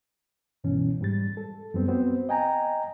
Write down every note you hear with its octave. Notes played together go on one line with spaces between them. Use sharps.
C#2 G2 B2 E3 C#4
G#2 G3 A6
A4
F#2 G3 B3 C4
B3 C4 F#4 C5
D#5 G5 G#5 A#5